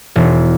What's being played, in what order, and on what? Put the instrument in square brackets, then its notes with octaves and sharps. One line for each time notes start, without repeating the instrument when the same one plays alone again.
[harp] E1